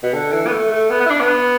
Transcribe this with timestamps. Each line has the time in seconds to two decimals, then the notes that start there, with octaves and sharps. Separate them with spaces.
0.03 B2
0.13 D3
0.32 E3
0.47 B3
0.51 A3
0.71 A3
0.90 B3
1.00 B3
1.06 E4
1.10 D4
1.20 B3